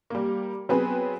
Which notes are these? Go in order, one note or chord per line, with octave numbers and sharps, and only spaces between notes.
G3 A#3
F#3 B3 C4 G#4 B4